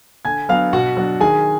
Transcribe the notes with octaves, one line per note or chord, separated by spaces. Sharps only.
D3 G#5 G#6
F#3 B3 D4 F5 F6
B2 F#4 F#5
F#3 D4
D#3 G#4 G#5